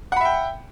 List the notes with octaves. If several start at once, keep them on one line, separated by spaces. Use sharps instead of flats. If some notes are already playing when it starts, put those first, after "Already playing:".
E5 F#5 G5 B5